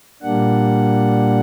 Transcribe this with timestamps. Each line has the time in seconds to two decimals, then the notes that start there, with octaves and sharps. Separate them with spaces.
0.22 A#2 G3 A#3 D4 F#5